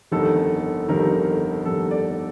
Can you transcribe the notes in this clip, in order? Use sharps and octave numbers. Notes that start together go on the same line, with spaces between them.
G1 F2 D#3 G3 A4
G1 F2 D#3 G3 A#4
G1 F2 D#3 G3 A4
D5